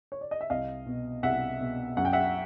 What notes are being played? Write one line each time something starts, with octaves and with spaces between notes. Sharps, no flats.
C#5
D5
D#5
E5
C2 D#5 F5
B2
C2 E5 F#5
B2
F#2 F#5
G5
E5 F#5